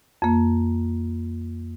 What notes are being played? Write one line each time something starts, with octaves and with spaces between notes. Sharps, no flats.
F2 A#3